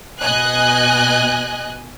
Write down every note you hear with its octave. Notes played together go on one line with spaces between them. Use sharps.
B2 D#5 G#5 F#6